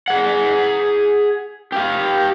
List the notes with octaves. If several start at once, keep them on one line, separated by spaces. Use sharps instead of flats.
G#4 F#5
G4 F5